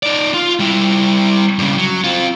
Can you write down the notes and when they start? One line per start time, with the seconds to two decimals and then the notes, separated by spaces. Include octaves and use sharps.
0.03 D#4 D5
0.34 F4
0.60 G3 E4
1.59 G2 C#3
1.77 F#3
2.04 C4 F4